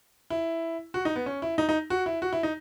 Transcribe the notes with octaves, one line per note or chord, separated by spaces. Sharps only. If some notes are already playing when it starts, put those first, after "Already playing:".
E4
F#4
D#4
B3
C#4
E4
D#4
D#4
F#4
E4
F#4
E4
D#4